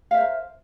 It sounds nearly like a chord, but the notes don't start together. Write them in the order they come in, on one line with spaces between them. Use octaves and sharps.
F5 E5 C5 A#4